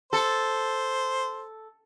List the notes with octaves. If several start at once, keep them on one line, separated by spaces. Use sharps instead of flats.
A4 C5